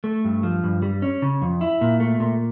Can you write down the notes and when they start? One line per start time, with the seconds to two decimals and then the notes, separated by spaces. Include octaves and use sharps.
0.04 A3
0.25 G2
0.43 F3
0.64 G2
0.82 G3
1.02 C#4
1.22 C#3
1.42 F2
1.61 E4
1.81 A#2
2.00 A3
2.20 A#2